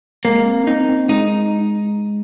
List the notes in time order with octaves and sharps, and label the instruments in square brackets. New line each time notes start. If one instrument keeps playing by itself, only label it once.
[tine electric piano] G#3 [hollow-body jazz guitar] A#3
[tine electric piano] C4
C#4
[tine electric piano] C4 [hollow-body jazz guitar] D#4
[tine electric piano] C4
[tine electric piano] G#3 [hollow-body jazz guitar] D#4